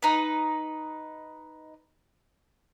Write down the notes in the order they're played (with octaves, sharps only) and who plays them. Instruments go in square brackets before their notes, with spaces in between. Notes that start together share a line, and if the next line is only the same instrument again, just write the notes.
[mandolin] D#4 B4